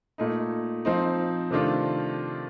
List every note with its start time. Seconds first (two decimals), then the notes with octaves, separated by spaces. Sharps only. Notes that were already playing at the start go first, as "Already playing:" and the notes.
0.18 A#2 A3 D#4
0.85 F3 C4 D#4
1.51 C3 D#3 A3 D4 F4